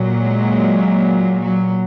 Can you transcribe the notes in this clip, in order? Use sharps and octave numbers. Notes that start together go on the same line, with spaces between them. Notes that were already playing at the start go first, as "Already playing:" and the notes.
Already playing: A#2 F#3
G#3
F#3